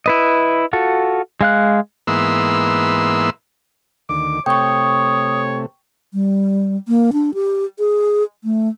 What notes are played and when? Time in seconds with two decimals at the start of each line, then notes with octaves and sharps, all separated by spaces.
0.06 E4 B4 D#5
0.73 F4 F#4 A4
1.41 G#3 F5 F#6
2.07 G#2 E3 A#3 B3 C6 E6
4.09 D2 D#3 D6
4.46 C3 A3 C#5 G5 C#6 D#6
6.14 G3
6.88 A#3
7.13 D4
7.34 G4
7.79 G#4
8.44 A3